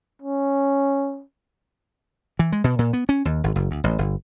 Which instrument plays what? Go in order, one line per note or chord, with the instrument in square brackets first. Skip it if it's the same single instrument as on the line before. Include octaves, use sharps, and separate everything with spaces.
[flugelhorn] C#4
[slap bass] E3
G#3
B2
A#2
B3
C#4
D#2
G#1
F#1
D2
A1
G1